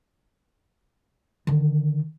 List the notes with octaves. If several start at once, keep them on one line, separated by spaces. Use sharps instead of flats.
D3 D#3